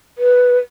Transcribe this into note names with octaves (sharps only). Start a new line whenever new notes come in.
B4